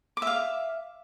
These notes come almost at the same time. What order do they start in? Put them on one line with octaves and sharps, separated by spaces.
D6 E5 F5